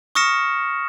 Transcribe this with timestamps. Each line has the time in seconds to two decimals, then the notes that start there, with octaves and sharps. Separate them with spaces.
0.15 C#6 D#6 F6 A#6 C#7 E7